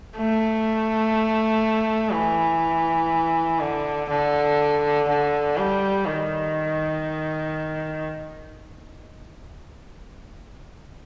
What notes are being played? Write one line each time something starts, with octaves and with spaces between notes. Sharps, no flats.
A3
E3
D3
D3
D3
G3
D#3